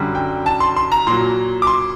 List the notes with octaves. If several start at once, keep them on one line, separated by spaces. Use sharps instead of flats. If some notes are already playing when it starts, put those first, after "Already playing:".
Already playing: F#2 D3 G3
G5
A5
C6
C6
A#5
A#2 F#3 C6
D6
C6